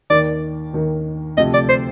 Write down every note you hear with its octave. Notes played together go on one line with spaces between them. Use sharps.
D#2 D#3 A#3 D5
D#2 D#3 A#3
D2 C3 F3 A3 D#5
D5
C5